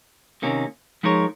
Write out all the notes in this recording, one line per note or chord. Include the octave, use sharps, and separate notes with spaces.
C3 D#3 A#3 C#4
F3 G#3 D#4 A#4 C#5